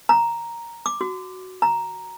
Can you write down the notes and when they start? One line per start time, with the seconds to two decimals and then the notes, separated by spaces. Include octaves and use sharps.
0.09 A#5
0.86 D6
1.01 F#4
1.62 A#5